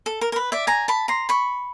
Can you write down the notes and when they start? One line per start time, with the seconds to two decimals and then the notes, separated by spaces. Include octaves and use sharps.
0.06 A4
0.21 A#4
0.32 A#4
0.36 B4
0.52 D5 E5
0.67 G#5 A#5
0.88 A5 B5
1.08 A#5 C6
1.29 B5 C#6